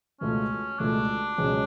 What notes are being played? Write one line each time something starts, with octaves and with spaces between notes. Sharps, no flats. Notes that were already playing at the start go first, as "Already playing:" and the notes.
C#2 B2 A3 C#4 F4
C#2 B2 A3 D4 F4
C#2 B2 F#3 C#4 G#4